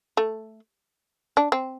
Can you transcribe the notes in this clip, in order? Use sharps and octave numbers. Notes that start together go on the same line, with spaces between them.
A3
D4
C4